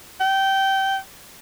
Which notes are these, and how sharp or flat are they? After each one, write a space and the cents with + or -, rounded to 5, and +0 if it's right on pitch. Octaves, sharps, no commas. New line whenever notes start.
G5 -20